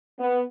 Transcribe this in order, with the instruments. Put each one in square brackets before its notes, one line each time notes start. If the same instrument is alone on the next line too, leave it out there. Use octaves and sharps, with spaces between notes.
[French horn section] B3